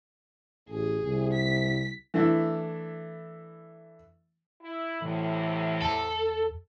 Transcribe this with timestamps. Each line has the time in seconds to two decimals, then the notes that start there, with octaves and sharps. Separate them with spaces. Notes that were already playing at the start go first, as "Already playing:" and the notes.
0.69 A1 G#4
1.03 C2
1.33 B6
2.14 E3 A3 D4 E4
4.62 E4
5.02 D2 A2 C3 E3
5.82 E2 A4